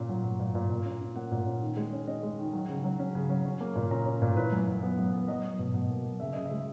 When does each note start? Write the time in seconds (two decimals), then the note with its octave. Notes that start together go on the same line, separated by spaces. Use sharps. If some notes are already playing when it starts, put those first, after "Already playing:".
Already playing: A#2 C#4
0.09 F#3
0.24 A#2
0.40 A#2
0.55 A#2
0.70 A#2
0.85 C#4
1.01 C#4
1.16 A#3 F#5
1.31 A#2
1.46 C#4
1.62 D#3
1.77 G#3
1.93 C#4
2.07 C#4 D#5
2.23 G#3
2.39 D#3
2.53 F#3
2.69 C#3
2.84 F#3
2.99 C#4
3.15 C#3
3.30 F#3
3.45 C#4
3.61 A#3
3.76 A#2
3.91 C#4 A#5
4.06 C#4
4.22 A#2
4.36 E3 B4
4.52 F#2
4.67 F#2
4.83 B3
4.98 F#2
5.13 B3
5.28 F#3 D#5
5.44 F#3
5.59 B2
5.74 B2
5.90 A#3
6.05 F#3
6.20 C#3 E5
6.33 C#3 D#5
6.46 E5
6.51 G#3